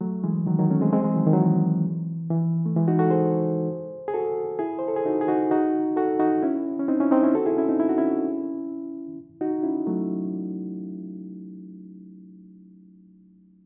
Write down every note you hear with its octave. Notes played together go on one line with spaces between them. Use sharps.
F#3 A3
E3 G#3
D#3 F#3
D#3 F#3
A3 C#4
G#3 C4
G#3 C4
E3 G#3
D#3 F#3
D#3
F#3
E3
E3
A3
E3 G#3
D#4 F#4
F#4 A4
G#4 C5
G#4
F#4 A4
E4 G#4
C5
A4
G#4
D#4 F#4
G#4
D#4 F#4
D#4 F#4
F#4 A4
D#4 F#4
C#4 E4
C#4
C4 D#4
C#4 E4
C4 D#4
C#4 E4
F#4 A4
E4 G#4
C#4 E4
C4 D#4
E4
F#4
C#4 E4
D#4 F#4
C#4 E4
F#3 A3